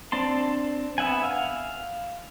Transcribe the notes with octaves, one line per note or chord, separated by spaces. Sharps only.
C4 D4 A5 C6
B3 E5 F#5 G#5
F5